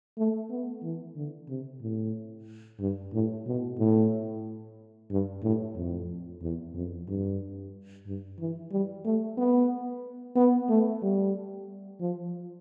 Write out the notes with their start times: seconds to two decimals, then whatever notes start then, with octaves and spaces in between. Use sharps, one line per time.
0.18 A3
0.50 B3
0.83 E3
1.15 D3
1.49 C3
1.81 A2
2.80 G2
3.13 A2
3.46 B2
3.79 A2
5.10 G2
5.43 A2
5.76 F2
6.42 E2
6.74 F2
7.08 G2
8.06 G2
8.39 E3
8.71 G3
9.05 A3
9.38 B3
10.36 B3
10.69 A3
11.02 G3
12.00 F3